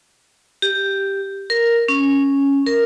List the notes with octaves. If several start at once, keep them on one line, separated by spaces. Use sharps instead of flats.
G4
A#4
C#4
A#4